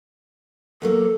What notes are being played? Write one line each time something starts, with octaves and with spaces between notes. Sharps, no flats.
E2 F#3 A#3 A4